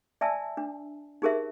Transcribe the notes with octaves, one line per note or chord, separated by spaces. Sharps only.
D5 E5 G#5 A5 E6
D4
D#4 G4 G#4 A#4 C5 E5